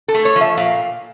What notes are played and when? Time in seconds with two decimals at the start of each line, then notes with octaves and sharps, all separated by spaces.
0.08 A4
0.14 A3
0.25 C#5
0.36 F3
0.41 E5
0.57 A#2 F5